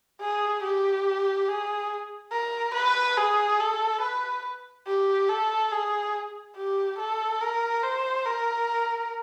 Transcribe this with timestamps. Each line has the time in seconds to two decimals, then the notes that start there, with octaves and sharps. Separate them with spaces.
0.21 G#4
0.63 G4
1.48 G#4
2.32 A#4
2.74 B4
3.18 G#4
3.60 A4
4.01 B4
4.87 G4
5.29 A4
5.72 G#4
6.56 G4
6.99 A4
7.41 A#4
7.83 C5
8.26 A#4